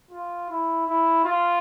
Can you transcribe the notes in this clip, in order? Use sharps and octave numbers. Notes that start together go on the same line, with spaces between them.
F4
E4
E4
F4